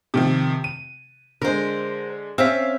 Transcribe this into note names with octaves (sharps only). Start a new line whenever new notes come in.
C3 D#3 F3
D#7
D3 G#3 A#4 C5
C4 C#4 E5 F5